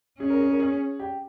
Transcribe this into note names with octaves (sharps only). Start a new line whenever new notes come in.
C#4 G#4
A#4
G#4
A#4
G#4
G4